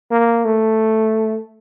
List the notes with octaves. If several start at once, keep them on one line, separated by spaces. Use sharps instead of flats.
A#3
A3